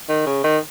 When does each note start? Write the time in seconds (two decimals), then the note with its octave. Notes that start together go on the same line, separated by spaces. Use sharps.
0.09 D#3
0.26 C#3
0.44 D#3